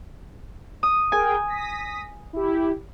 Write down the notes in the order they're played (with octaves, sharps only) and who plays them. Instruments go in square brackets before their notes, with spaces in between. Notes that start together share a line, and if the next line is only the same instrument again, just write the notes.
[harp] D#6
[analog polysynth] G#4 A#4 G5 [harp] G#5
[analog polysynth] D#6 A#6 B6
E4 G4